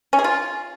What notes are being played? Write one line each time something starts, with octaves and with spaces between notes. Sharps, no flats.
C#4
G#4
F4